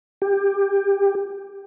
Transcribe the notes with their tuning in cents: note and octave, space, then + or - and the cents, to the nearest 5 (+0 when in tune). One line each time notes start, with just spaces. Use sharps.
G4 +20